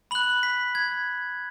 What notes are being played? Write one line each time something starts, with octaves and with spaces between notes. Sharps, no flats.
B5 F#6 F#7
B6
G#6